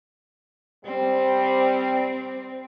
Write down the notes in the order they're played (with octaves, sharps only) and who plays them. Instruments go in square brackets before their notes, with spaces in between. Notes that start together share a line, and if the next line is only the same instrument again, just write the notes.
[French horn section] G3 C5 [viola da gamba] C4